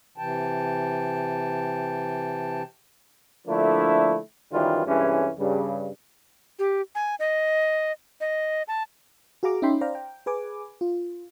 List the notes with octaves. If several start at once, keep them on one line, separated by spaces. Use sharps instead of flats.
C3 E3 G5 A5
D3 F3 A3 A#3 D4 E4
F#2 D#3 E3 F#3 G3 F4
C2 G2 E3 G#3 C#4
G2 C#3
G4
G#5
D#5
D#5
A5
F#4 G#4 F5 A#5 D6
C#4 D#4 E5 G5 B5 C6
C5 D5 F5 G5 A#5
G5
G#4 B4 G#5 D6
F4